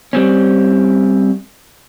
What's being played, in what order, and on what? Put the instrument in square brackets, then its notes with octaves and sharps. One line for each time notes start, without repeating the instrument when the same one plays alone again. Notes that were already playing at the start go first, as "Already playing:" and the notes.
[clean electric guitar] G3 C4 C#4